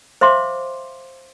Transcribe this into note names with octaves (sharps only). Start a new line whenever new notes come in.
C5 E5 F5 C6 D6